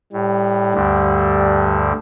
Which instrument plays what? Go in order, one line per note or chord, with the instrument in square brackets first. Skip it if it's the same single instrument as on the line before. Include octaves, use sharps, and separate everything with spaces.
[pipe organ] A2 [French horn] G3
[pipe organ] D2 G2 D3